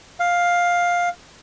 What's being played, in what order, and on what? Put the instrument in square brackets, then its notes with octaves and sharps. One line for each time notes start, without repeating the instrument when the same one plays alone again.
[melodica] F5